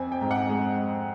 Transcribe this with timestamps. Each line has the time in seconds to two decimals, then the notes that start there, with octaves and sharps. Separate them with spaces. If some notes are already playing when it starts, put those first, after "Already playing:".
Already playing: F2 C4 G#5
0.12 G5
0.21 G#2
0.31 F#5
0.49 G#3